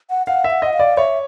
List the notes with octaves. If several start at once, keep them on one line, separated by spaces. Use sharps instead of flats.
F#5
F5 F#5
E5
F#5
D#5 F#5
F5
D5
C#5 E5